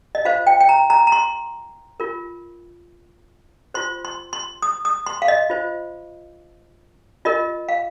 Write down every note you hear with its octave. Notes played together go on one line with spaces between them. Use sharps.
D#5
F4 C5 F5
G5
G5
A#5
A#5
A#5
C6
F4 A#4
F4 C5 C6
C6
C6
D#6
D#6
C6
F5
D#5
F4 C5
F4 A#4 D#5
F5